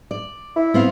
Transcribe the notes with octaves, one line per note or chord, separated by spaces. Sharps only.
D5
E4
B3 C4 F5